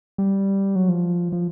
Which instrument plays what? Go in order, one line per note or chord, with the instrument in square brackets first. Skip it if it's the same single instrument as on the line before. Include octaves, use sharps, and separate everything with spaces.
[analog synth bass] G3
F#3
F3
F3